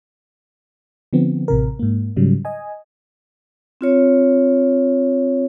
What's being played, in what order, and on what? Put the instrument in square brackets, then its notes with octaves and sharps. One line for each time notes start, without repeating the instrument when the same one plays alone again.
[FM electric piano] D3 F3 B3 C4
A1 C3 A#4
G#2 A#3
G#2 C#3 F#3 G3
D#5 G#5
[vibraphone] C4 F4 C#5